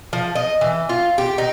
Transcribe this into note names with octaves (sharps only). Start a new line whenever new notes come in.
F3
D#5
E3
F4
G4
D#4